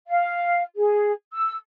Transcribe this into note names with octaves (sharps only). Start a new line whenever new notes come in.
F5
G#4
E6